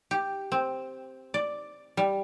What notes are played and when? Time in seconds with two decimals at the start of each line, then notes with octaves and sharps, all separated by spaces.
0.11 G4
0.52 C4
1.34 D5
1.97 G3